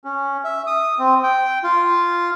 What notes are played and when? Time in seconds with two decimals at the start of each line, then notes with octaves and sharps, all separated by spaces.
0.04 C#4
0.44 E5
0.67 D#6
0.99 C4
1.23 G5
1.63 F4